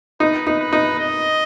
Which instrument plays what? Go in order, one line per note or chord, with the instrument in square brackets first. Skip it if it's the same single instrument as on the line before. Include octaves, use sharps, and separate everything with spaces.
[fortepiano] D#4 [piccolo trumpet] B4
[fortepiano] D#4
[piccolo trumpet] B4
[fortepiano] D#4
[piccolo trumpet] D#5